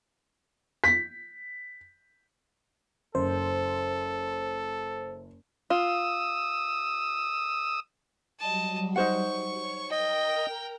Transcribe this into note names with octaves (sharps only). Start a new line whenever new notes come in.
B6
F#1 A4 C5
F4 D#6 E6
F#3 G3 D#5 A5
D#4 C5 F#5 C#6
C#5
A#4 D#5 G5 A#5